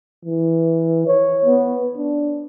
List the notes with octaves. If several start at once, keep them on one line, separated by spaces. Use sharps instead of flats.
E3
C#5
B3
D4